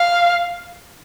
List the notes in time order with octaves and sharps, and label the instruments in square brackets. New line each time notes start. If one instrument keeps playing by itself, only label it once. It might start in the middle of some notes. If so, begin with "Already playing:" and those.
Already playing: [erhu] F5